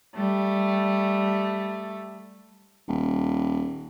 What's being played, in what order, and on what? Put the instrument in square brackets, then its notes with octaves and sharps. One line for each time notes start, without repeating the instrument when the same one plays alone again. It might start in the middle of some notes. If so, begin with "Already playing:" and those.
[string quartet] G3 A3
[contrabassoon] D#1